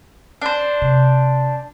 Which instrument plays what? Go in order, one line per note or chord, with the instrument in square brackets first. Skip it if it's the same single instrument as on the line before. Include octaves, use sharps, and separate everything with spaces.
[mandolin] D4 C5
[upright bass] C3